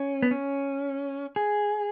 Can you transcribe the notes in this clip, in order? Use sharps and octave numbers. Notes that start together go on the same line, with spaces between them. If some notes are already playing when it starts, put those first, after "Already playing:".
Already playing: C#4
B3
C#4
G#4